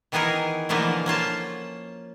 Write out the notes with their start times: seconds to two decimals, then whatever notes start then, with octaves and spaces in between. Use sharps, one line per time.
0.12 D#3 E3 B3 D#4 G#4 A#4
0.69 B2 D3 E3 F3 A#3 B3
1.06 A#3 C#4 F4 A5